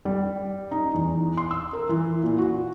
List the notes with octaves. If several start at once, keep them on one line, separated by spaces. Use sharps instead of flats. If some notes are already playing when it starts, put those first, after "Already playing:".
G3
D#4
E2
C6
E6
A#4
E3
A#2
F#4